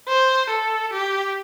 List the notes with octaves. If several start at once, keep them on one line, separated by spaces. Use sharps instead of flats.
C5
A4
G4